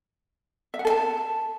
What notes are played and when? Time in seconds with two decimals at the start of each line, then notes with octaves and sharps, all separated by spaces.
0.74 E5
0.79 F#5
0.85 A4
0.90 A5